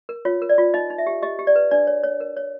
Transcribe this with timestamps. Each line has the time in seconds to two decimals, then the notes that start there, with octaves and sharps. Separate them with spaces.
0.09 A#4
0.25 F4 C#5
0.42 A#4
0.49 D5
0.58 F4
0.74 D#4 D#5
0.90 D#4
0.98 E5
1.06 G4
1.23 G4 D#5
1.39 G4
1.47 D5
1.56 B4
1.71 D4 D5
1.87 C#5
2.04 C#5
2.20 A#4
2.37 C#5